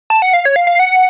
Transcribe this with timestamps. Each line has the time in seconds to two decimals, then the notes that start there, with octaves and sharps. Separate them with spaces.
0.10 A5
0.22 F#5
0.33 F5
0.45 C#5
0.56 F5
0.67 F5
0.79 F#5